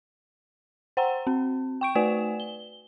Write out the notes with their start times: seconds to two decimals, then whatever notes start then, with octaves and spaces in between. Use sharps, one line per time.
0.97 C5 F#5 G5 A#5
1.27 C4
1.81 G5 C#6 D7
1.95 A3 F#4 B4 D5 G#5 E7
2.40 G7